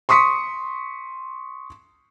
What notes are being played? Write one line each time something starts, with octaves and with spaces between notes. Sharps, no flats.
C6 C#6 D#6 B6 C#7